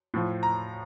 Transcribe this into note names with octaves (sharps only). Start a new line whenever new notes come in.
A2 F3
A#5